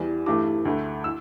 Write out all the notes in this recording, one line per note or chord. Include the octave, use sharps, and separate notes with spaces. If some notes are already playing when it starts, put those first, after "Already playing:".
Already playing: E2 E3 G3
G2 E3 A3 D6
D2 D3 A3
E6